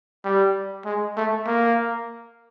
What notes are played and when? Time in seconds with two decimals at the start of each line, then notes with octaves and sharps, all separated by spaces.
0.24 G3
0.85 G#3
1.17 A3
1.46 A#3